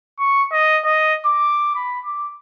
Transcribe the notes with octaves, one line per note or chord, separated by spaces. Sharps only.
C#6
D#5
D#5
D6
B5
D6